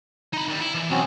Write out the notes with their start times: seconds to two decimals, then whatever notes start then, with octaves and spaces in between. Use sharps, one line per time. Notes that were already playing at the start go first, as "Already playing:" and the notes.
0.33 D#4 B5
0.48 D#3 G3
0.61 E4
0.74 E3
0.91 B1 C4 C#4 F#4